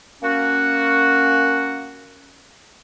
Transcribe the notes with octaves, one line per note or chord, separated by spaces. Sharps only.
A#3 C#4 F#4